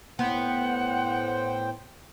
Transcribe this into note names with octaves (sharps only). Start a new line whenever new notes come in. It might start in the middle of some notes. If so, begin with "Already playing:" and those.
A2 B3 C5 F#5 G5